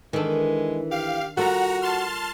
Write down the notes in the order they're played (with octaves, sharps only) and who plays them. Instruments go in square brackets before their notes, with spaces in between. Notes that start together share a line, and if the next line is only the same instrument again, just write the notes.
[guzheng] D#3 D4 [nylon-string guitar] E3 A4 [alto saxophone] G#3
[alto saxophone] G4 [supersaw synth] F5
[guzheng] G3 [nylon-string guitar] F4 A4 A#4 [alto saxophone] F#4 [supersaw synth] F#5 A#5
[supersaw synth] A5 C6 F6